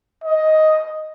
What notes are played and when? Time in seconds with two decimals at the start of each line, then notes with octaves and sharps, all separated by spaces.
0.24 D#5